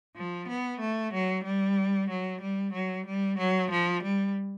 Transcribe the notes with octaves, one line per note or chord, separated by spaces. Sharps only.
F3
B3
A3
F#3
G3
F#3
G3
F#3
G3
F#3
F3
G3